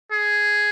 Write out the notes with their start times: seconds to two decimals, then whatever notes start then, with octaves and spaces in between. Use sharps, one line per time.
0.12 G#4